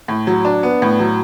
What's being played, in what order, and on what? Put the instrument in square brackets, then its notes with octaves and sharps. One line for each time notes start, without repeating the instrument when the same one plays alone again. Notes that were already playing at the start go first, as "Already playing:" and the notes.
[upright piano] A2
F#3
D4
B3
A2
F#3